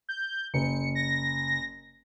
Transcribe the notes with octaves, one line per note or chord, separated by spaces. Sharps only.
G6
F#1 C#7
A#6